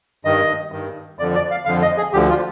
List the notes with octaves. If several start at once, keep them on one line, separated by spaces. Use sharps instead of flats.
G2 D#3 D#5
G2 D#3
F2 D3 F3 D5
D5
F5
F2 D3 F3 F5
D#5
G#4
D2 D3 F3 G4
F4